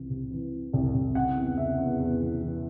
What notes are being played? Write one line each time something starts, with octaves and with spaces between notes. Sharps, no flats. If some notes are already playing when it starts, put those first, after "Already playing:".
Already playing: C2 C3 E3
C3
E3
E3
C2
C2
C#3 F#5
E2
C#3 E5
E2
E2
E3
E3